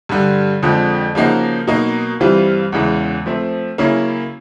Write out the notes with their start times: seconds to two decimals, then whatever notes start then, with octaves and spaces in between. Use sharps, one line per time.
0.09 G2 D3 G3
0.63 F2 D3 F3 G#3
1.15 C#3 F3 A#3 D#4 F#4
1.67 B2 F#3 A#3 D#4
2.20 G2 E3 G3 C4 F4
2.72 E2 C#3 E3 G#3
3.26 F3 A3 C4
3.78 C#3 F#3 A#3 C#4 E4